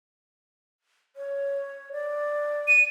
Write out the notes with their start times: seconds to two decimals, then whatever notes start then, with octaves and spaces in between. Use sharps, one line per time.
1.16 C#5
1.92 D5
2.68 D#7